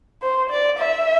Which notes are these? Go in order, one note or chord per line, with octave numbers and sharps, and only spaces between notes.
C5
D5
E5